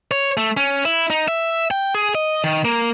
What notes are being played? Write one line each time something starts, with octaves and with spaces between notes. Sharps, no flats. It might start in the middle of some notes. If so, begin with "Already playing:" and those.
C#5
A3
C#4
E4
D#4
E5
G5
G#4
D#5
D#3
A#3